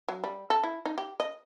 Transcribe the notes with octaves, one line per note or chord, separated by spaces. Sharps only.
F#3
G3
A4
E4
D#4
G4
D#5